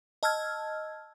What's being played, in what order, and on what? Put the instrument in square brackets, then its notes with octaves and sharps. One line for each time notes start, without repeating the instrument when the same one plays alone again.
[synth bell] D#5 A5 E6 F6 G#6